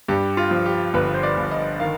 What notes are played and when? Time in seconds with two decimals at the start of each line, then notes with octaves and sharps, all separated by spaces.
0.08 G2 G4
0.37 F4
0.51 F3
0.66 G4
0.94 G1 B4
1.14 C5
1.23 D5
1.37 G1
1.51 D#5
1.80 D#3 F5